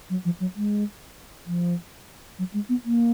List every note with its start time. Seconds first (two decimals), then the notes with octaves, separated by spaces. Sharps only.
0.10 F#3
0.25 F3
0.40 F#3
0.56 G#3
1.47 F3
2.39 F#3
2.54 G#3
2.69 B3
2.85 A#3